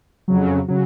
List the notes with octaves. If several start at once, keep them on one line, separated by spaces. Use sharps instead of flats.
F2 C#3 F#3
C#3 F#3